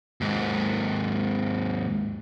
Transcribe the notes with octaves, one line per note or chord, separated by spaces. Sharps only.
D#2 G#2